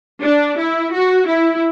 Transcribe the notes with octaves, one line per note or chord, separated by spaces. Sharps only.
D4
E4
F#4
E4